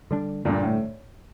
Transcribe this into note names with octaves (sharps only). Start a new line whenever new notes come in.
D3 G3 D4
G2 A#2 D3 G3 D4
A2